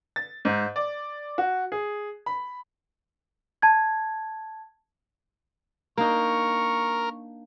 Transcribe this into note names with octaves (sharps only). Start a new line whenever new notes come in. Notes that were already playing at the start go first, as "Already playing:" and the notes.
A6
G#2
D5
F#4
G#4
B5
A5 G#6
A#3 D4 D#4 A#4 C#6